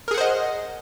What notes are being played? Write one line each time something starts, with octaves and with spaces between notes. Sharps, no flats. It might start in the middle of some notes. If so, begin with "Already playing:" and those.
G#4 A#4 C5 D#5 F#5